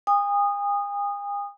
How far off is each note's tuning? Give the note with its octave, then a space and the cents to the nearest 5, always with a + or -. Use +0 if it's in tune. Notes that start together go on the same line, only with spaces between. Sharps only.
G#5 -45 D#6 -10